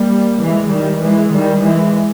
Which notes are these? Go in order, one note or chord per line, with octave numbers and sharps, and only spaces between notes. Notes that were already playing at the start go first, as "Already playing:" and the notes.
Already playing: G3 A#3
E3 G#3
D#3 G3
E3 G#3
D#3 G3
E3 G#3